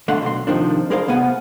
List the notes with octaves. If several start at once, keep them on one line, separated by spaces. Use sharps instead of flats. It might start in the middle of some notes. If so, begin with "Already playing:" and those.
D3 G#3 A3 F5 F#5
B1 C6
C3 D#3 F3 D4
G3 G#4 A#4 C5 F5 A5
C3 B3 F5 F#5 G#5